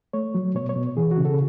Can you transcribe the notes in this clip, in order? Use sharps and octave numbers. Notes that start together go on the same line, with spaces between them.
A3 C#5
F#3
B2 C#5
C#5
B2
E3 G#4
F#4
C#3
A4